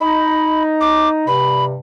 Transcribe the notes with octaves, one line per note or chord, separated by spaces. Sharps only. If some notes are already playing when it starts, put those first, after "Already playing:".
D#4 B5
D6
G2 C3 B5